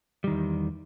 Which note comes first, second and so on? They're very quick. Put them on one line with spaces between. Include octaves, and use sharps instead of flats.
G3 D#3 E2